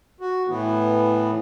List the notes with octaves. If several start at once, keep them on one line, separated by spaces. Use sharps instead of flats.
F#4
A2 E3 B3